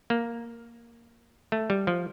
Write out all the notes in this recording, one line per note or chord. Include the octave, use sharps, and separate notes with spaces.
A#3
A3
G3
F3